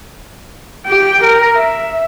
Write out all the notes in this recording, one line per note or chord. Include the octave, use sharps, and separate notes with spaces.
G4 G5
A#4
E5